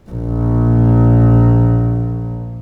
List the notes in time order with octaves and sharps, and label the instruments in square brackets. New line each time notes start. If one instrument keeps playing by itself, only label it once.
[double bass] A#1 A#2